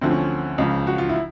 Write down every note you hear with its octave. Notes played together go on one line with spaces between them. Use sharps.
D2 D3 F3 C4
C#4
C#2 C#3 F3
F#4
F4
E4